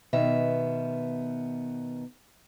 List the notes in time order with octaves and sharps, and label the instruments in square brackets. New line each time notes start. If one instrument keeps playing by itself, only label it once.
[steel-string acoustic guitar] B2 D#3 B3 E5